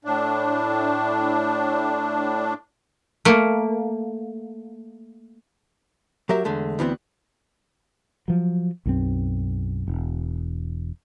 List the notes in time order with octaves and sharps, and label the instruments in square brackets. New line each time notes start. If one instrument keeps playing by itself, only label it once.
[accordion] A2 D4
[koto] A3 A#3
[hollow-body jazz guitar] F#3 G4 A#4 E5
E2 D3 G#3 A3
D2 E3 B3 C4
[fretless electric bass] F3 F#3
B1 F#2 C4
E1